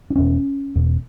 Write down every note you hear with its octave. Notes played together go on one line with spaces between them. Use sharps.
D4
E1 E2 B2 C#4
E1 E2 B2